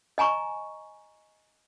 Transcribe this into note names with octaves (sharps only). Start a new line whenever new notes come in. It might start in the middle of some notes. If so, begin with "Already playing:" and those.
D#5 G#5 A#5 C#6